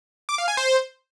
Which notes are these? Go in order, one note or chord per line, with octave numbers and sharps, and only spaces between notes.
D6
F5
G#5
C5